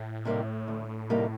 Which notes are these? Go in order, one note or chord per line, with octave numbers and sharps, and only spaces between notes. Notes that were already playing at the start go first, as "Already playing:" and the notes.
Already playing: A2
C3 G3 A#3 D#4
D2
C3 G3 A#3 D#4